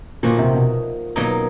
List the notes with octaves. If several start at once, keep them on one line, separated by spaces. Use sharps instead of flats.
A#2 F3 A#3 D#4 F#4
C3
B2
B2 F#3 A#3 D#4